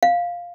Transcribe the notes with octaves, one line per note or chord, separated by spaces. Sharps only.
F5